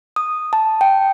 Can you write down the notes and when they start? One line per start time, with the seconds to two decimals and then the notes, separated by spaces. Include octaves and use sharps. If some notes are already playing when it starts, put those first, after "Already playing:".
0.16 D#6
0.53 A5
0.81 G5